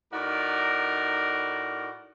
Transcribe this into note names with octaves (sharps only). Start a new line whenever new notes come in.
A2 D#4 F#4 A#4 D5